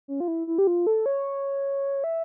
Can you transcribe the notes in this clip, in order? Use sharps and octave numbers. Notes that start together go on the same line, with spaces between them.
C#4
F4
E4
E4
G4
F4
A4
C#5
E5